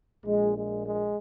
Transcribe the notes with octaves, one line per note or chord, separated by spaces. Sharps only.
A#1 A#2 G#3
G#3
G#3